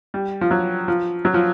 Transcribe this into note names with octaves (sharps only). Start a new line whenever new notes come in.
G3
F3
F#3
F3
F#3
F3